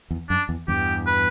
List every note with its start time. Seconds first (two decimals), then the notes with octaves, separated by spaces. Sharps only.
0.11 E2
0.29 F#2 D4
0.49 E2
0.68 E2 G2 G4
1.07 B4